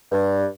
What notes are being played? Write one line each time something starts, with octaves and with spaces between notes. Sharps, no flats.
G2